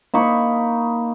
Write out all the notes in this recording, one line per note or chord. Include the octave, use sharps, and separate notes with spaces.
A#3 D#4 B5 C#6